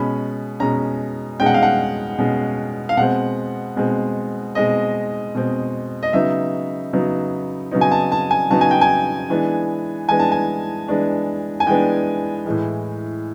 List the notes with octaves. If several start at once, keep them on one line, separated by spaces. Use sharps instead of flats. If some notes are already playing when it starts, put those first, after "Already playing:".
Already playing: B2 G#3 C#4 B5
B2 G#3 C#4 A#5
B2 G#3 C#4 G5
F#5
F5
F#5
B2 G#3 C#4
F5
B2 G#3 C4 F#5
B2 G#3 C4
B2 G#3 C4 D#5
B2 G#3 C4
D#5
C#3 F#3 B3 D#4 E5
C#3 F#3 B3 D#4
C#3 F#3 B3 D#4
G#5
A5
A5
G#5
C#3 F#3 B3 D#4 A5
G#5
G5
G#5
E3 G#3 B3 D4
E3 G#3 B3 D4 G#5
A5
G#5
E3 G#3 B3 D4
G#5
E3 G#3 B3 D4 G5
A2 E3 G#3